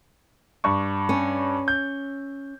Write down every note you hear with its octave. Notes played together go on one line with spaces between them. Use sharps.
G2 C#6
C#4
G6